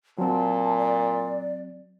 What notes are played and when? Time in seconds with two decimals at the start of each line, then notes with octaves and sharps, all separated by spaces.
0.18 A#2 F#3 C4 A5
0.78 D5